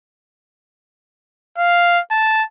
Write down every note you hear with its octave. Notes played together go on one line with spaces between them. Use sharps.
F5
A5